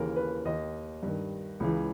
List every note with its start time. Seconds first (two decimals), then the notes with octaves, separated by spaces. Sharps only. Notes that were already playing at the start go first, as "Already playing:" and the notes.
Already playing: D#2 C#3 E3 A#4
0.16 B4
0.45 D#2 D#3 D#5
1.03 G2 D#3
1.60 C#2 C#3 E3